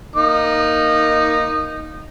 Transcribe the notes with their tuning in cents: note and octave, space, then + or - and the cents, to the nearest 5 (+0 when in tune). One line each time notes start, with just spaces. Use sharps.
A#3 +0 D#4 +0 D#6 -25